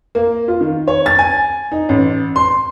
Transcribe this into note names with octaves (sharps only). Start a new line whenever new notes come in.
A#3
F4
D#3
C#5
A6
G#5
D#4
A1
C6